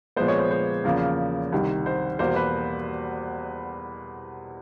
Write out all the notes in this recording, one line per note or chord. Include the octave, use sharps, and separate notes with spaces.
A#2 F3 G#3 B3 C5
C#5
C5
C5
E2 C#3 F3 A#3
C2 C3 D#3
C5
E2 B2 G3 A#3 C5
B4